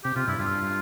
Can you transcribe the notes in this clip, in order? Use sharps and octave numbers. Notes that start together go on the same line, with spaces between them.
C3 G4
C3 F4
G2 E4
G2 F4